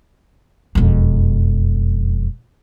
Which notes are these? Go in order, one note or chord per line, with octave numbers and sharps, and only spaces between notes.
E1 F2